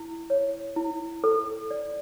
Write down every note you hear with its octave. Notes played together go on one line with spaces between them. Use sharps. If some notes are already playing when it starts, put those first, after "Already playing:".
Already playing: E4
C#5
E4
A4
D5